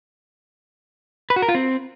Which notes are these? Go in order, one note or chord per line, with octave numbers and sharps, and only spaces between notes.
B4
F#4
A#4
F4
C4